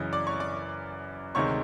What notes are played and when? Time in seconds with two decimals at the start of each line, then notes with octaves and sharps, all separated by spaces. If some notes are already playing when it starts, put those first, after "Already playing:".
Already playing: F#2 C#3 E3 D#5
0.13 D5 D6
0.27 C#5 C#6
0.40 D5 D6
1.35 D2 C3 D#3 G#3 C#5 C#6